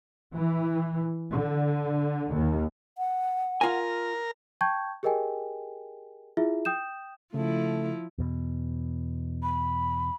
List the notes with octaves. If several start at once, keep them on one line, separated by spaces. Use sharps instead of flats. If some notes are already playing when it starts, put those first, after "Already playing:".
E3
D3
D#2
F#5
F4 A#4 G#5
G5 A5 C#6 G6 G#6
G4 G#4 A#4 D#5 G5 G#5
E4 F4 G#4 E5
G5 D#6 G6 E7
C#3 F3 A3 E4
E2 B2
B5